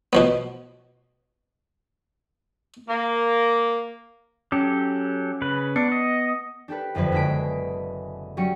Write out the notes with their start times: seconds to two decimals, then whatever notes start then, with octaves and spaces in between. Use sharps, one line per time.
0.13 B2 F3 B3
2.87 A#3
4.52 F#3 C#4 G4 A4
5.42 C#3 B4
5.76 B3 D4 C#7
5.92 D#5
6.68 D4 G4 A4 B4
6.95 F#1 F2 D3 B4 G#6
7.12 B2 D3 G#3 E5 B6 D7
8.37 F#3 G3 C#4 C#7